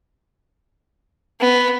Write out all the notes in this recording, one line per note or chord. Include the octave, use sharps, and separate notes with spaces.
B3